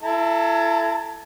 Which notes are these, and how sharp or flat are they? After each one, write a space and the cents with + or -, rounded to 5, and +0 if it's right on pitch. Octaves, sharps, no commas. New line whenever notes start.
E4 +30 A4 +0 A#5 -30